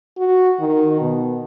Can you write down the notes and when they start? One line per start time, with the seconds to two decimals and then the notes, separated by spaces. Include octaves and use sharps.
0.18 F#4
0.60 D#3
1.01 B2